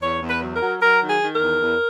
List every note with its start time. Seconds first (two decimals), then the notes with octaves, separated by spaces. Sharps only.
0.01 E2 C#5
0.22 E2
0.28 B4
0.42 F#3
0.54 A#4
0.62 F#3
0.81 F#3 A#4
1.01 D#3
1.08 G#4
1.21 D#3
1.34 A#4
1.41 E2
1.61 E2